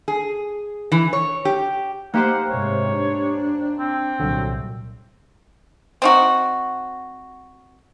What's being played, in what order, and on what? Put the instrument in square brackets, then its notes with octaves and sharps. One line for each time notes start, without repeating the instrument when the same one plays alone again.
[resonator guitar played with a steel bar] G#4
E3
C#5
G4
[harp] A#3 [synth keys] D#4 G4 C5 [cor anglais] F#5
[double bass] G#2 C3 [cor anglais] C#5
[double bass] D4
[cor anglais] C4
[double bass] C2 A#2 [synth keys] D3 F#3
[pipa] C4 D#4 F#4